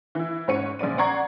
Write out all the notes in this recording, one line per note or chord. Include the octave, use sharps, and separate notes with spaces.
E3 E4
G#2 C#4 C#5 C#7 D#7
A#1 C#3 D5 D#7
D5 F#5 A#5 C#6 G#6 C7